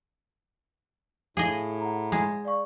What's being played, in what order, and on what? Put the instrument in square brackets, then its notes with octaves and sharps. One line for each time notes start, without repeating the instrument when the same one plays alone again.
[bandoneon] A2 [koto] G#4 D#5 [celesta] F5
[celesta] F#5 A#5
[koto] G#3
[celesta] D5 F5 C#6